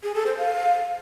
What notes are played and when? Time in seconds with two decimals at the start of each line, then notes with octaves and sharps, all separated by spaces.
0.03 G#4
0.15 A4
0.26 C5
0.38 F5